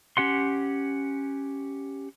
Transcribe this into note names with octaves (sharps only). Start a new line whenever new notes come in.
C#4 G4 F#5 C6